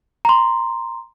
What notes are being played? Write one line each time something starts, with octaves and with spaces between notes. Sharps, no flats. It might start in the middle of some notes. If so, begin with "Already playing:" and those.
A#5 C6